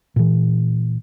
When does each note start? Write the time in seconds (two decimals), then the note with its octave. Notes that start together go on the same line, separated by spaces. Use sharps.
0.16 A#2 E3